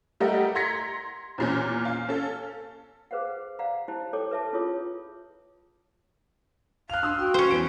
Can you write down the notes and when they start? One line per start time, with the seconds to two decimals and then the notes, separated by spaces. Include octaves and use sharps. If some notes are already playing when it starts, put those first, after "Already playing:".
0.20 G3 A3 G4 A#4 D#5 F#5
0.55 A#5 C6 G#6 A#6 B6 C#7
1.38 E2 A#2 C#4
1.85 F5
2.09 C#4 A4
3.11 G#4 B4 C5 F5 F#5
3.59 D5 F5 F#5 A#5
3.88 E4 G4 C5 A5 A#5
4.13 G4 A4 C#5 G5 D6
4.31 B4 E5 A5
4.53 C#4 E4 F4 G#4 C#5 D#6
6.90 F5 F#6 F7
7.03 D4 C6 D#6 E6
7.19 F#4 G5 C6
7.34 C#4 C5
7.51 E2 E3 B4 D7